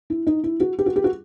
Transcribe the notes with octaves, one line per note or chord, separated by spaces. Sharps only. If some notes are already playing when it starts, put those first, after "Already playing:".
E4
D#4
E4
F#4
G4
F#4
G4
F#4